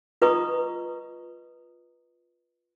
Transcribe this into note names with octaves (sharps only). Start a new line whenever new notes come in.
F4 B4 D#5 A#5 C#6 D#6